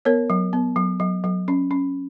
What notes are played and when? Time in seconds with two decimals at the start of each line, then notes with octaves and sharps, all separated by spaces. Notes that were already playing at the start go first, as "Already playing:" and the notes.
0.05 B3 A#4 C#5
0.30 F#3
0.53 B3
0.76 F#3
1.00 F#3
1.24 F#3
1.48 C#4
1.71 C#4